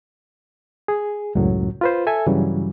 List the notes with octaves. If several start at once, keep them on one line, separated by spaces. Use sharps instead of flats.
G#4
C#2 F#2 A2 F#3
F4 B4 C5
A4 E5 G#5
G2 C#3 E3 F#3 G3